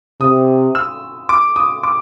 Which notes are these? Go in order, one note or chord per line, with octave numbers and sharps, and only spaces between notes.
C3 D#6
E6
D6
D#6
D6